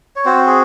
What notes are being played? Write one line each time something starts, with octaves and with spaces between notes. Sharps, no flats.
C#5
C4 F#4 C5
G#4